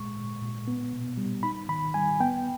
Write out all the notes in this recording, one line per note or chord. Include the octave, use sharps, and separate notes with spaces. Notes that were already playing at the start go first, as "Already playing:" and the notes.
Already playing: A#2 G#3 C#6
A#2
A#2
B3
B2
G3
D#4 B5
D#3 B5
G3 G#5
B3 G5